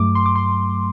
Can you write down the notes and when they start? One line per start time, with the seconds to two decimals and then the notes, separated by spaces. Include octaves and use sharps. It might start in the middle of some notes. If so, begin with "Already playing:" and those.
Already playing: G2 F#3 A3 D6
0.15 C6
0.26 D6
0.35 C6